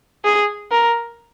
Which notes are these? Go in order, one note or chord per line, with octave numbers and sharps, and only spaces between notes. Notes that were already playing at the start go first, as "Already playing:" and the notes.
G#4
A#4